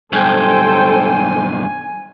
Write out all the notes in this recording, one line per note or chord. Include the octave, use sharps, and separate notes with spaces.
B1 G2 A4 C5 G5 G#5